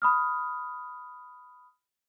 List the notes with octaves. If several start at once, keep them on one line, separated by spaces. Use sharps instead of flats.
B5 D#6 F6